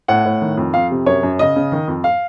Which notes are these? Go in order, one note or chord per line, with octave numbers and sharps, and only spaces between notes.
A2 F#5
A2
D#3
F2
F2 F5
C3
F#2 C#5
F#2
C#3 D#5
C#3
D#3
F2
F5